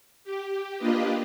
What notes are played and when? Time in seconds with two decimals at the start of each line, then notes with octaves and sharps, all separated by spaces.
0.24 G4
0.78 A#3 D4 F4 G4 B4 D#5